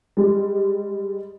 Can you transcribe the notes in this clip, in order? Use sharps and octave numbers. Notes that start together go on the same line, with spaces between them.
G3 G#3